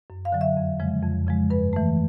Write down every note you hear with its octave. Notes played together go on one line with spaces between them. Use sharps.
F#2
F5
D3 F#3
E5
F2
C#3 F3 G#3
F2
C#3 F3 G#3
G2 B4
E3 A3